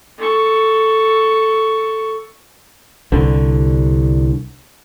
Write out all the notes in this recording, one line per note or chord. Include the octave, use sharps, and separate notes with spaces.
A4 C#6
C2 D3